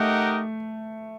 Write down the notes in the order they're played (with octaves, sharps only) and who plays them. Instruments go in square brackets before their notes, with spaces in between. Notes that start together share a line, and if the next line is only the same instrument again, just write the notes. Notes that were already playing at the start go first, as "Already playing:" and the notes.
Already playing: [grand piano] A3 [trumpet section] D#4 G4 A#4 D#5 F#5